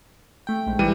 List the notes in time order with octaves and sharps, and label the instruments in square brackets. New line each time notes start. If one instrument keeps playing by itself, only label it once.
[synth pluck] A3 G5
A#1 G#2
[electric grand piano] E3 G3 D#7